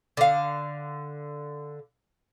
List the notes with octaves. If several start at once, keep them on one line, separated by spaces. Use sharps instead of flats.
D3 F5